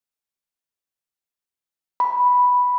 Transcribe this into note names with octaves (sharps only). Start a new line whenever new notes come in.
B5